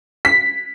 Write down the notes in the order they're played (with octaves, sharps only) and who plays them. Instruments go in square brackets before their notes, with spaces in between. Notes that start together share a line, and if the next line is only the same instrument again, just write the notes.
[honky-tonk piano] B6